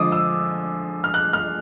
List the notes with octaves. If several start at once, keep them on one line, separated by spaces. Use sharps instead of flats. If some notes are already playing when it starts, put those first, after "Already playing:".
Already playing: D3 F3 G#3 D6 D#6
E6
F6
F#6
F6